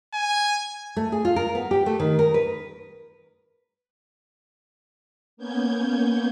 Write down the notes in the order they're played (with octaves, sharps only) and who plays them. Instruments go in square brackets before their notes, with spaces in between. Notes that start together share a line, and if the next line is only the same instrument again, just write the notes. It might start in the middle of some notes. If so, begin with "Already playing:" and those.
[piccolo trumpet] G#5
[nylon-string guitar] A3
G#4
F4
A#4
B3
G4
A3
D#3
A#4
B4
[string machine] A#3 B3 C#4 G6 G#6